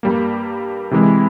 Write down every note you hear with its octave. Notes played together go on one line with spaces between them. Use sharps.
G2 G3 A#3
C3 E3 G#3 E4